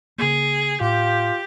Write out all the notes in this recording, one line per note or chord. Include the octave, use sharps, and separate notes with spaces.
C#3 A#3 G#4
A2 F4 G4